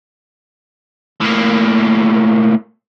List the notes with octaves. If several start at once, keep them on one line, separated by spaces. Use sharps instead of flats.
A2 A#3